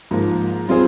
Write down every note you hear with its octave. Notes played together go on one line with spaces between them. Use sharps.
G#2 F3 A#3
G3 C4 F4 G#4 C5